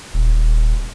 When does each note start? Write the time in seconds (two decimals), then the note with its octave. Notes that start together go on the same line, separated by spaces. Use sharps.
0.14 D#1